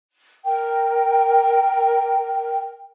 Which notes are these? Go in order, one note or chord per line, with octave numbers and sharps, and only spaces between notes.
A#4 G5